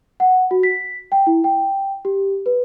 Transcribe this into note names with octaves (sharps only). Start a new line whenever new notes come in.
F#5
F#4
B6
G5
E4
G5
G4
B4